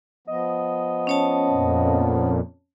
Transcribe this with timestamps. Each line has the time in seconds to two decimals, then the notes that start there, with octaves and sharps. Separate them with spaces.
0.27 F3 B3 D#5
1.07 C#4 C#5 A5
1.49 F2 A#2